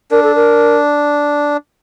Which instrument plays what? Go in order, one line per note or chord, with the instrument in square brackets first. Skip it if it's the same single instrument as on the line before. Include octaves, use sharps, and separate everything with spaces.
[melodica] D4 [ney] A#4
[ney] A4
A#4